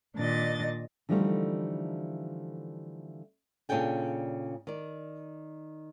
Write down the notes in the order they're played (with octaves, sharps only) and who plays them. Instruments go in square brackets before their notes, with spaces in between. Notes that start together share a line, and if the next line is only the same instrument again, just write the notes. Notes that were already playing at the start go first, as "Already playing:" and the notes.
[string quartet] A#2 D#3 D4 D#5 A6
[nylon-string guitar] D3 E3 F3 G3 A3 D#4
A#2 C#3 D4 A4 G5 G#5
D#3 D5